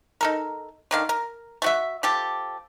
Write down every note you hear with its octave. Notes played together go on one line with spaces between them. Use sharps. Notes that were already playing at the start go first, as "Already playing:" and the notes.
D#4 A4 A#4
D3 D#3 F5
A#4
A3 F#4 E5
F3 G4 A4